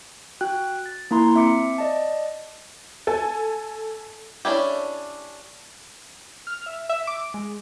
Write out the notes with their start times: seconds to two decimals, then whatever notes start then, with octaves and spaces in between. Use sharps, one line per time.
0.41 F#4 G5 F#6
0.86 A6
1.11 A#3 E4 A#5 C6
1.35 C4 E5 D6 C#7
1.78 D5 D#5 A5
3.07 A4 G#5
4.45 C#4 D4 E4 G4
6.47 F6
6.66 E5
6.89 E5
7.07 D6
7.34 G#3